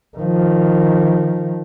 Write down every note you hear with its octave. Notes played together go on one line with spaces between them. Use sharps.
D#3 F3